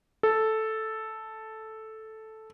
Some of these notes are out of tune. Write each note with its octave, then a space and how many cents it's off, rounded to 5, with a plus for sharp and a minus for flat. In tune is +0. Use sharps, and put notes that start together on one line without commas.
A4 -5